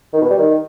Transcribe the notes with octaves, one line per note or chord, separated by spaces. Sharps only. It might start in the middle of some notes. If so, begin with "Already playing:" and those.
D#3
B2
G3
D#3